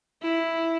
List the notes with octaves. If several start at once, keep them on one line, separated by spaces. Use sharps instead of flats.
E4